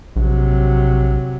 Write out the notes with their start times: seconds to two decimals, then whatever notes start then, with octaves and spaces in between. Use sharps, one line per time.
0.16 A#1 C3 F#3